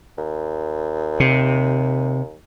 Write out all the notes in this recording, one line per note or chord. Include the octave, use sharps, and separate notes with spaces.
D#2
C3